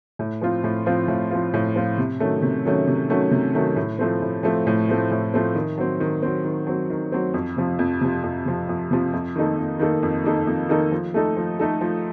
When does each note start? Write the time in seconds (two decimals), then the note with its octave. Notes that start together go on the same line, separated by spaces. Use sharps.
0.19 A2
0.42 F3 C4 F4
0.64 A2
0.86 F3 C4 F4
1.08 A2
1.30 F3 C4 F4
1.54 A2
1.75 F3 C4 F4
1.98 C3
2.20 D#3 F#3 A3 C#4
2.42 C3
2.65 D#3 F#3 A3 C#4
2.87 C3
3.10 D#3 F#3 A3 C#4
3.31 C3
3.55 D#3 F#3 A3 C#4
3.76 A2
3.99 F3 A3 C4
4.22 A2
4.43 F3 A3 C4
4.67 A2
4.89 F3 A3 C4
5.11 A2
5.34 F3 A3 C4
5.55 D#3
5.78 F#3 C4
6.00 D#3
6.23 F#3 C4
6.45 D#3
6.67 F#3 C4
6.90 D#3
7.12 F#3 C4
7.34 F2
7.56 C3 F3
7.79 F2
8.01 C3 F3
8.23 F2
8.46 C3 F3
8.69 F2
8.91 C3 F3
9.13 F2
9.36 D#3 A#3 D#4 A4
9.58 F2
9.80 D#3 A#3 D#4 A4
10.03 F2
10.24 D#3 A#3 D#4 A4
10.47 F2
10.69 D#3 A#3 D#4 A4
10.92 F3
11.14 A3 D#4 A4
11.37 F3
11.59 A3 D#4 A4
11.81 F3